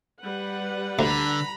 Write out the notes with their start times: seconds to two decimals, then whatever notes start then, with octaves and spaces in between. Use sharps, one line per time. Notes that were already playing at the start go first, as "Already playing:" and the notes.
0.22 G3 B4 F#5
0.99 D2 D3 A#5 B5